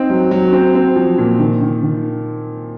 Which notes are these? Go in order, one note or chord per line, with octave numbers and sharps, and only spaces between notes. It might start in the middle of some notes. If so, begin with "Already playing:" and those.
Already playing: C4 D#4
F#3
F#3
C4
C4
F3
A#2
D#3
D#3
D#3